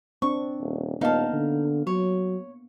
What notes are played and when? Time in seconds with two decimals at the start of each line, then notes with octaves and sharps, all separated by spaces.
0.22 C4 D4 C#6
0.61 D#1
1.01 D#1 A#3 B3 D#4 F5 A5
1.33 D3
1.87 F#3 C#5